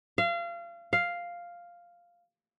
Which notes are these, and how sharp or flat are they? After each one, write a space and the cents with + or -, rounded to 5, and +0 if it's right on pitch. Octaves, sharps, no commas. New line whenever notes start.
F5 -30
F5 +0